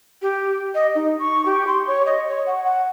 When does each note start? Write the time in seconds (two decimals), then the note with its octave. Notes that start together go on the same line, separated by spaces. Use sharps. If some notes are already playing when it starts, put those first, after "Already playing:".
0.22 G4
0.75 D#5
0.95 D#4
1.19 C#6
1.46 G4
1.67 C6
1.87 C#5
2.06 D#5
2.28 C#5
2.47 F#5
2.64 F#5